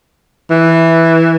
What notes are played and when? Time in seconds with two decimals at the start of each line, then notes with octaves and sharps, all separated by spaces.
0.51 E3